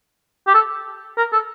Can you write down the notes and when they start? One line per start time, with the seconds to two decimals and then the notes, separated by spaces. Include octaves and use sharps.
0.47 G4
0.54 A4
1.17 A#4
1.33 A4